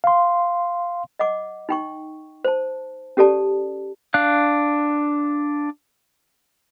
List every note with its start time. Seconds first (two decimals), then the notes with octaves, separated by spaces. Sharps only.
0.04 F5 C6
1.19 D#5 F#5 D6
1.69 D#4 G5 C#6
2.45 C5 A5
3.17 C#4 G4 A4 D5 A5
4.14 D4 F5 F#6